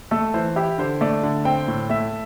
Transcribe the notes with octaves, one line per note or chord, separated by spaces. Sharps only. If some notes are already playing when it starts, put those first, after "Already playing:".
A3 A4
E3 C5
E4 G4
D3 C5
A3 D5
D3
C4 G5
A2
A3 E5